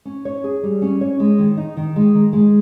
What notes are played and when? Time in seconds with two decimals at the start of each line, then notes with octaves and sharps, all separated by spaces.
0.05 C#4
0.25 C#5
0.44 G#4
0.63 G3
0.82 C#4
1.01 C#5
1.20 G#3
1.39 D#3
1.57 D#4
1.77 D#3
1.96 G#3
2.15 D#3
2.33 G#3